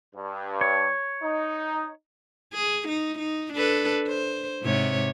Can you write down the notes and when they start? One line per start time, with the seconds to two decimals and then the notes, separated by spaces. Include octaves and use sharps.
0.15 G2
0.61 C#5
1.23 D#4
2.54 G#4
2.89 D#4
3.19 D#4
3.53 D4 A4 B4
4.08 C5
4.63 G#2 C3 C#5